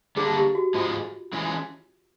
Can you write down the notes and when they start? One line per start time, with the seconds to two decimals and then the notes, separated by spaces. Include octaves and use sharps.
0.16 D3 G3 A#3 D4 G#4
0.37 G4
0.55 F#4
0.74 G#2 F3 G#3 F4
1.33 E3 G#3 C#4